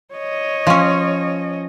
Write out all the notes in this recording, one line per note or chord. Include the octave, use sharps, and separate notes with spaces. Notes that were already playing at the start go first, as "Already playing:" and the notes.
C#5 D#5
F3 C#4